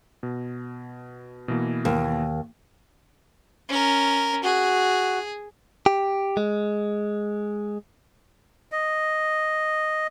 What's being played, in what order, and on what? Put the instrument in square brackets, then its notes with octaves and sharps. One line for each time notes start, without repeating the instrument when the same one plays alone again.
[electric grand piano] B2
B2 E3 A#3
[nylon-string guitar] D#2
[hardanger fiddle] C#4 A#4
[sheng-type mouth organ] F#4 [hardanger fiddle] G#4
[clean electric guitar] G4
G#3
[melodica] D#5